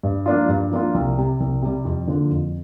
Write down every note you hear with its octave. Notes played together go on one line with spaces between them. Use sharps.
G2
F3 A#3 D4 F4
G2
F3 A#3 D4 F4
C2
C3 G3
C2
C3 G3
F2
D3 F3 A#3 D4
F2